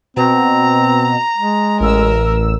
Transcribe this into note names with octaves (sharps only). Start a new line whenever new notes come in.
B2 C4 A#5
G#3
A1 A#4 E6